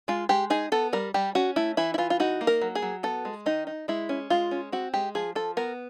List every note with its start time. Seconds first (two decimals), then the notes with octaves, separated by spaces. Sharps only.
0.08 G#3 F4
0.29 G#3 G4
0.50 D#4 G#4
0.72 B3 A4
0.93 G3 A#4
1.14 G3 G4
1.35 C#4 F#4
1.56 A3 E4
1.77 E3 E4
1.94 E4
1.98 E3 F4
2.10 F4
2.20 D#4 F#4
2.41 A#3
2.47 A#4
2.62 F#3
2.75 G#4
2.82 F#3
3.03 B3 A4
3.25 G#3
3.46 D#3 D#4
3.67 D#4
3.88 G#3 E4
4.09 C#4
4.30 G#3 F4
4.51 C#4
4.72 C4 F#4
4.94 G#3 G4
5.15 F3 G#4
5.35 F3 A4
5.57 B3 A#4